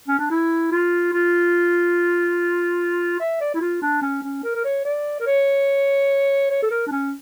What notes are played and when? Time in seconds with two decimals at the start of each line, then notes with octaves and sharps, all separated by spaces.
0.08 C#4
0.19 D4
0.30 E4
0.72 F4
1.13 F4
3.20 E5
3.41 D5
3.54 E4
3.61 F4
3.82 D4
4.02 C#4
4.23 C#4
4.44 A#4
4.55 A#4
4.64 C#5
4.85 D5
5.20 A#4
5.26 C#5
6.50 C#5
6.62 A4
6.71 A#4
6.87 D4
6.92 C#4